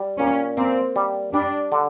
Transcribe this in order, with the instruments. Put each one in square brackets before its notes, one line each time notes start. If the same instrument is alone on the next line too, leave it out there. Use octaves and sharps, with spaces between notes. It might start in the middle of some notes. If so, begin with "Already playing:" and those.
Already playing: [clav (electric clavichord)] G3
[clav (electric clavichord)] A#2 [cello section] C#4
[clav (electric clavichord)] A#3 [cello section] C4
[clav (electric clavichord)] G3
[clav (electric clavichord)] G3 [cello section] D4
[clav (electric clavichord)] D3